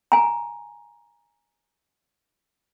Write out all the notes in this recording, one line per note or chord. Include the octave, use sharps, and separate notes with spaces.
G#5 A#5